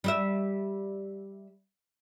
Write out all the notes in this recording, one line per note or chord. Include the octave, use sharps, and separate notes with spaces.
G3 D#5 E5